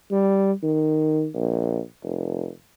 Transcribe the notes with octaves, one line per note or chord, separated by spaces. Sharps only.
G3
D#3
A#1
F1